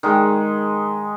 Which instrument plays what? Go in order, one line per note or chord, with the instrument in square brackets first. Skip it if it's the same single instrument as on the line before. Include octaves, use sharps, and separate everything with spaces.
[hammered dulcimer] D#3 G#3